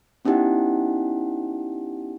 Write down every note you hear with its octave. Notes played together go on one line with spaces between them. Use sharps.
B3 C#4 D#4 E4 G4 F#5